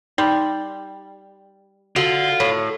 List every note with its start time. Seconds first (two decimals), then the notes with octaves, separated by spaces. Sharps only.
0.18 G3 D#4
1.96 D3 F4 F#4
2.40 A2 C#5